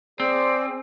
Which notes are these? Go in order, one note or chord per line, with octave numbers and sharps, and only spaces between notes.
C4 G#4 C5 D5